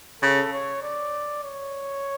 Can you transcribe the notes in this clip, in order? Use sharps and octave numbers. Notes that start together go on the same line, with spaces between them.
C#3 A4
C#5
D5
C#5